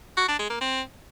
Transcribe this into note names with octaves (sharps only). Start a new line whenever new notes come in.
F#4
D4
G#3
A#3
C4